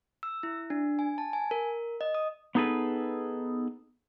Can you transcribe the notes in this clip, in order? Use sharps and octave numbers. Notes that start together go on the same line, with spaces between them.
E6
E4
D4
G#5
A5
G#5
A#4
D#5
D#6
B3 D#4 G#4 A4 B4